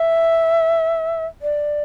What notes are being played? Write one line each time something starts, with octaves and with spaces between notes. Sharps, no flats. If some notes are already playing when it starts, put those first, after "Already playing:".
Already playing: E5
D5